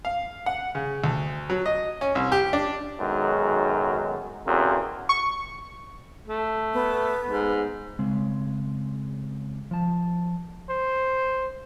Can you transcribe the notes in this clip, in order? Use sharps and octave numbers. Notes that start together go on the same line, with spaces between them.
F5
F#5
C#3
D2
F#3
D#5
C#4
C2
G4
D4
B1 F#2 D#3 G#3
A1 E2 C#3 C4 F#4 A#4
C#6
A3
B3
G#2
C#3 G#3 C4
F3 A5
C5